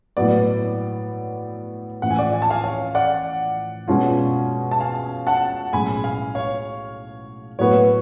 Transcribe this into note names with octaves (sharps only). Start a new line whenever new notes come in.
A2 F#3 B3 D5
A1 A2 F3 F#5
G#5
D5 F#5
G#5
A5
F5 G#5
C#5 F5
D5 F#5
B2 G#3 C#4 F4 G#4
A5
F5 G#5
F#5 A5
B1 A2 G#3 C#4 G#4 G#5 B5
F5 G#5
C#5 F5
A2 F#3 B3 F#4 B4 C#5